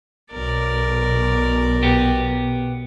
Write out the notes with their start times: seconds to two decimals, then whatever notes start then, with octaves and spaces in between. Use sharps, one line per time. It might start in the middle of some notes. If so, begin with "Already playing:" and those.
0.32 B1 B2 A#4 D5
1.83 B3 G4